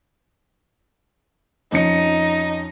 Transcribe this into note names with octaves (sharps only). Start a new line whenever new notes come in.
F2 C#4 D#4 C#7